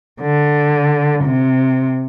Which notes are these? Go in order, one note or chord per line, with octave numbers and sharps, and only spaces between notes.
D3
C3